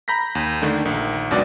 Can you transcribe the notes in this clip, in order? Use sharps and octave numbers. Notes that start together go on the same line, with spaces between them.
A#5 B5 G6 A#6 B6
D#2
D3 D#3 A3 D4
A#1 D#3
C#2 F#2 B2 D4 D5